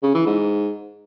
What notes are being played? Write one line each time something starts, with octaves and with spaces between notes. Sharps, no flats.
C#3
E3
G#2